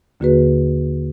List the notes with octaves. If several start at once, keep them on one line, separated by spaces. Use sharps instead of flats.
D#2 D3 A#3 F#4 G#4 B4